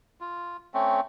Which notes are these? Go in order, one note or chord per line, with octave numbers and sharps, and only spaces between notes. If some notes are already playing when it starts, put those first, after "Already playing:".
F4
A3 C4 C#4